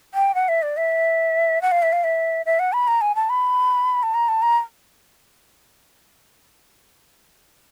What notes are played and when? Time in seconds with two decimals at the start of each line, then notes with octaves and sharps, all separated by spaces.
0.14 G5
0.35 F#5
0.48 E5
0.62 D5
0.77 E5
1.62 F#5
1.71 F5
1.82 E5
1.92 F5
2.04 E5
2.46 E5
2.59 F#5
2.73 B5
2.87 A#5
3.01 G#5
3.15 A5
3.30 B5
4.03 A5
4.14 A#5
4.28 A5
4.42 A#5